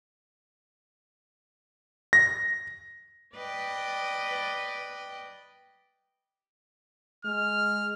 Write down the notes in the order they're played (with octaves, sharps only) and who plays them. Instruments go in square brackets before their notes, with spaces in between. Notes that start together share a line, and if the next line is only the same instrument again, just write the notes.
[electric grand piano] A#6
[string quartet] B4 D5 D#5 G5
[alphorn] G#3 [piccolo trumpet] F6